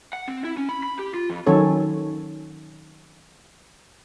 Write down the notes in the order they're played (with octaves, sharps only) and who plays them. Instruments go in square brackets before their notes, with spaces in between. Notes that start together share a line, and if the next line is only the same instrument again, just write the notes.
[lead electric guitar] F#5
C4
E4
C#4
B5
B5
G4
F4
F2
[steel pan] D#3 F#3 C#4 A4 C#5